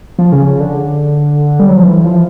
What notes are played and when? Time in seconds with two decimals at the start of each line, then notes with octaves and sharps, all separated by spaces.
0.19 F3
0.32 C#3
0.46 C#3
0.60 D3
1.60 G3
1.69 F#3
1.77 F3
1.85 E3
2.04 F3